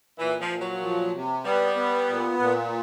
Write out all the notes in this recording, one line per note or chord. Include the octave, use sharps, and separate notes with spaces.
A#2 E3
F3
A#2
F#3
F3
C3
G3 B3
B3
A#2
A#2